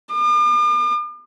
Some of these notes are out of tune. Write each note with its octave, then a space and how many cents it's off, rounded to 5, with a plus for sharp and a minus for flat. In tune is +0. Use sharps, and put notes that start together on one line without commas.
D6 +45